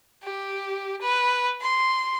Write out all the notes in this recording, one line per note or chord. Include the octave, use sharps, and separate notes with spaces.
G4
B4
C6